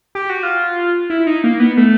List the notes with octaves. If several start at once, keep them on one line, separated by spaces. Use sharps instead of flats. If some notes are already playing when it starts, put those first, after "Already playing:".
G4
F#4
F4
E4
D#4
A#3
B3
A3